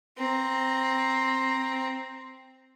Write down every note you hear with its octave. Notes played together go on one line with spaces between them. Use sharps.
C4 A#5